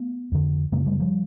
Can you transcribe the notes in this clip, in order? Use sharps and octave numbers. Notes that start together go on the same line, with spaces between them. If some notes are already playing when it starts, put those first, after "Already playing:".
Already playing: A3 B3
F2 D3
F#2 C#3 G#3 A#3
G3 A3
F3 G3